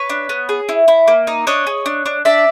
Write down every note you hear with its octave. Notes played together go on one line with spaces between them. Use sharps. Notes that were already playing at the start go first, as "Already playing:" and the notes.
Already playing: B4 C#5
D4
B3
G#4
E4
E4
A#3
D#4
D4 C#5 D#5
G#4
D4
D4
D4 D5 E5